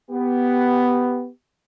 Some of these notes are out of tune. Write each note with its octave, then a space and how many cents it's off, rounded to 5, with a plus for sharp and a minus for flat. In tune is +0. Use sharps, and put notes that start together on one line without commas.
B3 +5 G4 +0